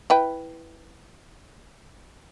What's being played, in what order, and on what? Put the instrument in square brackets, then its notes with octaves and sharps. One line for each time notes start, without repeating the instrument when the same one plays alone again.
[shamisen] E4 B4 G5